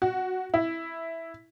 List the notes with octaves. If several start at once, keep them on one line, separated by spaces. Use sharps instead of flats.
F#4
E4